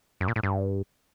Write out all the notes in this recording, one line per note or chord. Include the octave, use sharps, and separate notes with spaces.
F#2
A#2
A2
G2